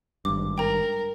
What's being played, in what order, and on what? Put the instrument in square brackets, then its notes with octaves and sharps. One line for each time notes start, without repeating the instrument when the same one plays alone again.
[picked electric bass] G#1 G2 [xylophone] D6
[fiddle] A#4 [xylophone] G5 A#5